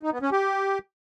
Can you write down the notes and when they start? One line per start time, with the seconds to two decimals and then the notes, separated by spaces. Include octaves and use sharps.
0.03 D#4
0.13 B3
0.22 C#4
0.32 G4